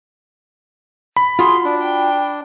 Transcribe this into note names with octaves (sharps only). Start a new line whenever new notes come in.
B5
F4 F#4 G#4 C6
D4 D5
G5